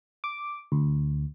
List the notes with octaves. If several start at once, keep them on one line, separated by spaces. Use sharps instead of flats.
D6
D2